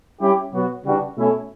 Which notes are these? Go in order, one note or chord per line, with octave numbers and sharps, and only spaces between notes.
G3 C#4 E4 G4
B2 F#3 B3 F#4
C#3 E3 G3 D4 F#4
B2 A3 C#4 E4